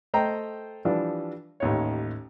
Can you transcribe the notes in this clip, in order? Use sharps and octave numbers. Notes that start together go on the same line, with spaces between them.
A3 C5 D#5 G5 A#5
E3 F3 G3 D4
A1 D#2 C#5